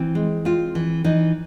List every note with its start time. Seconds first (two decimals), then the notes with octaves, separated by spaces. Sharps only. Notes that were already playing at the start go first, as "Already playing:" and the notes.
Already playing: E3 C4 E4
0.15 G#3
0.45 C4 F4
0.75 E3
1.04 E3 D#4